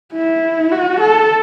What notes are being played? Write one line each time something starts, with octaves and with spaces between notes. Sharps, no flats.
E4
F#4
A4